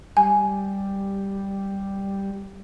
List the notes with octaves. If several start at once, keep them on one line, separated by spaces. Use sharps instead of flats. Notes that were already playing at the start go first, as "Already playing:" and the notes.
G3 G#5